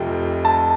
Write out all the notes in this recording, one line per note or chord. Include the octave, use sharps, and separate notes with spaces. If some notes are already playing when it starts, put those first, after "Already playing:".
Already playing: F1 F2 C3 G5
A5